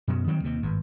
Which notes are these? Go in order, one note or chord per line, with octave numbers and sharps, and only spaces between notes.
F#2 B2 F#3
D#3 F#3 G3 C4
D#2 C3 D#3
G#1 G2